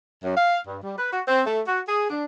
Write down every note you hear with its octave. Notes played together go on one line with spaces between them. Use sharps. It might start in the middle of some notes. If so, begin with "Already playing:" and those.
F#2
F5
G2
G3
B4
F#4
C4
A3
F#4
G#4
D4